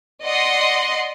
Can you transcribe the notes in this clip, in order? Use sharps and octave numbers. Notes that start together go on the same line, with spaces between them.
D5 D#5 F#5 C6